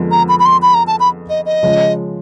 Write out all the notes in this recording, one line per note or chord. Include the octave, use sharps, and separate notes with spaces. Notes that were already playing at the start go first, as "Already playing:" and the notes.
Already playing: F2 D3 F3 G#3 B3
A#5
B5
B5
C6
B5
A#5
A5
B5
D#5
D#5
C#3 F3 G#3